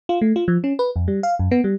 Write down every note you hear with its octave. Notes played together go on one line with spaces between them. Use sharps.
F4
A3
F4
F3
C#4
B4
F2
G3
F5
F#2
B3
G3